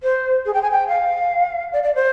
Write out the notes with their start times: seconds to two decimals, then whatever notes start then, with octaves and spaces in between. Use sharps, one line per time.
0.02 C5
0.45 G#4
0.53 G5
0.62 G#5
0.71 G5
0.88 F5
1.73 D5
1.83 D5
1.95 C5